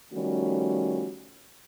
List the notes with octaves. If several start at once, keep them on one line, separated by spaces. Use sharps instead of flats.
D#3 F3 G3 A3 C#4 F#4